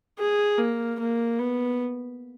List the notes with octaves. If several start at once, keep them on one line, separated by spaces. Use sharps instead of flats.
G#4
A#3
A#3
B3